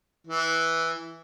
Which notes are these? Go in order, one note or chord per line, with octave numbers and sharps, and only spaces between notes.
E3